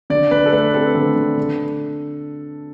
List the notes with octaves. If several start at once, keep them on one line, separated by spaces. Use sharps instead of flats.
D3 D5
D3 B4
A4
A3 B4
C4 A4
D3
D3
D3